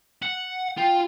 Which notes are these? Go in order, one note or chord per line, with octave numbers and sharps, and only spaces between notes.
F#5
F4 G5